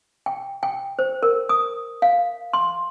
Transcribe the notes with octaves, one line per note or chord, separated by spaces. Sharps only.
G5
G5
C5
A#4
D#6
F5
C6